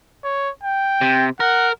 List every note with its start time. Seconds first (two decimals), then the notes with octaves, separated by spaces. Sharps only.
0.24 C#5
0.63 G5
1.01 C3
1.40 A#4 F#5